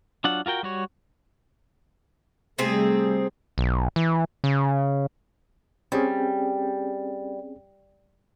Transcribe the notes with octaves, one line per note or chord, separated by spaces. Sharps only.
F#3 D4 F4 F#5
F4 F#4 A#4 G5
G3 F#4 C#5
C3 G3 A3 C4 G#4
B1
E3
C#3
G3 C4 C#4 G#4